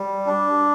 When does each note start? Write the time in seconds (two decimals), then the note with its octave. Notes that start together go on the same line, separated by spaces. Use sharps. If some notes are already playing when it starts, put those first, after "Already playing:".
Already playing: G3
0.27 D4